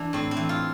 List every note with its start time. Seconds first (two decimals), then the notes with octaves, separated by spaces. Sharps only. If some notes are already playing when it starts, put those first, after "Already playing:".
Already playing: E3 D4
0.13 A2 C4
0.31 C4
0.37 E3
0.49 F4